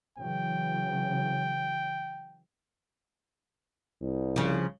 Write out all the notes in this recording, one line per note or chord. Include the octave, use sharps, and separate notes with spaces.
C#3 E3 F#3 G5
C2
C#3 F3